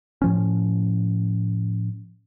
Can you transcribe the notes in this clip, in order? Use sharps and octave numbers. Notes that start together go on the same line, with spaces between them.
A2 F3 C#4